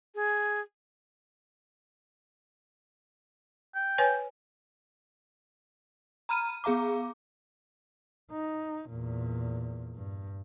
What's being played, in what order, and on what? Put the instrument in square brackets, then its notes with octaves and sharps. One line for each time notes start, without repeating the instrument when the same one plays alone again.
[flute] G#4
[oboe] G5
[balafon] B4 C#5 G#5
[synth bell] A#5 B5 F6 D#7
B3 G#4 F5 A#5 D6
[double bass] D#4
E2 A#2
G2